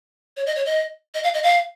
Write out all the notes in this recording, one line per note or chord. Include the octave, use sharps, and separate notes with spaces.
C#5
D#5
C#5
D#5
D#5
F5
D#5
F5